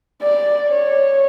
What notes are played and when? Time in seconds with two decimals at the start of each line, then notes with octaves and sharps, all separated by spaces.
0.23 D5
0.69 C#5